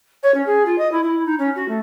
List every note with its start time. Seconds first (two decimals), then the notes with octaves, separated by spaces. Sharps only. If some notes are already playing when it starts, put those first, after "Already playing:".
0.23 C#5
0.34 C#4
0.46 G#4
0.66 F4
0.78 D#5
0.92 E4
1.04 E4
1.26 D#4
1.39 C#4
1.56 F#4
1.69 A3